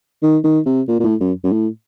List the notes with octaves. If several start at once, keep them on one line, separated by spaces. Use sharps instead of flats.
D#3
D#3
C3
A#2
A#2
A2
F#2
F#2
A2